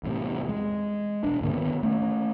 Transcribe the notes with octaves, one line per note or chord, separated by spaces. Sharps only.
E2 A2 C3
G#3
E1 D4
D2 G#2 D3 A#3
D#3 B3
A3 C#4